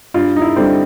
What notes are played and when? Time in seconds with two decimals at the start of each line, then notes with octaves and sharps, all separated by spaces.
0.14 G2 F4
0.36 D#4
0.42 E4
0.56 D3 G3 C4